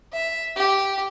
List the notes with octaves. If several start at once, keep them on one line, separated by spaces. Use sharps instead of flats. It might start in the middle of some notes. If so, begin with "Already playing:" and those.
E5
G4